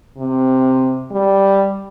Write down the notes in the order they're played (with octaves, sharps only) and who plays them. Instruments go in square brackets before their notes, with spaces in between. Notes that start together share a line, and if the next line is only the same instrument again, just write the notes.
[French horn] C3
G3